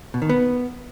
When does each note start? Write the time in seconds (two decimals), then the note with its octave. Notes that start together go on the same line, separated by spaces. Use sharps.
0.14 B2
0.22 D#3
0.29 B3